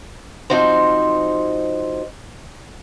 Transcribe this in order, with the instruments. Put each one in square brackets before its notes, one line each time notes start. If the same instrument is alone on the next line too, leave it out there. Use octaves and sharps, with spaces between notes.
[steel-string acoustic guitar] F3 C4 D#4 F#4 C5